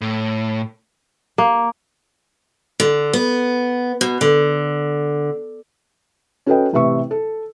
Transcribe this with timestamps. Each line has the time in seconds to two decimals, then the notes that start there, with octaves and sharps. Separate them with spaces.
0.01 A2
1.38 A#3
2.80 D3
3.13 B3
4.01 B2
4.21 D3
6.46 C#4 F#4 A4 B4 D#5 G5
6.73 A1 C3 B4 E5 C#6
7.11 A4